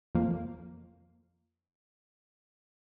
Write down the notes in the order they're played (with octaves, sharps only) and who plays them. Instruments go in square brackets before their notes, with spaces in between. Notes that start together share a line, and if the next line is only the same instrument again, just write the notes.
[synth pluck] F2 F3 A#3